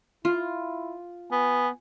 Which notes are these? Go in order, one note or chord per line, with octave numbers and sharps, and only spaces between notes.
E4 F4
B3 G#5